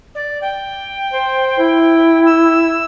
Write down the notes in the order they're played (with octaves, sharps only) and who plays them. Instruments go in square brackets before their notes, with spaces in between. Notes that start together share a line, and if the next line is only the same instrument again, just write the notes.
[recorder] D5
G5
[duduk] C5
E4
[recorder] E6